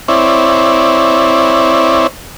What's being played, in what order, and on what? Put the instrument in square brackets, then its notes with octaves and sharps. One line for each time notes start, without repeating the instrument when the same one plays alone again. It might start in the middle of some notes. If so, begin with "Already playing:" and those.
[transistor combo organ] C4 E4 C#5 D5